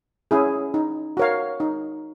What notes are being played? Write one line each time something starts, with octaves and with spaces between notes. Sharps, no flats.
C#4 E4 G#4
D#4
F#4 A#4 C#5 F5
D#4